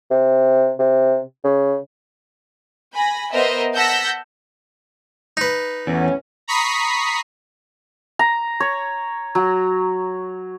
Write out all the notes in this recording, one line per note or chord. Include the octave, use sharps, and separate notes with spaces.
C3
C3
C#3
G#5 B5 A#6
B3 A#4 C5 D#5 E5
F#5 A5 E6 G6 A#6 B6
D#4 B4
E2 A2 B3 C#4
A#5 B5 C#6 D#6 B6 C7
A#5
C#5
F#3